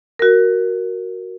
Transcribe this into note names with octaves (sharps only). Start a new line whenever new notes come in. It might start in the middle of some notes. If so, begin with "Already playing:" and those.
F#4 A#4